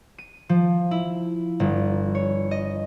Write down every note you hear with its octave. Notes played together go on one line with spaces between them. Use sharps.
D#7
F3
E4
G1
C#5
D#5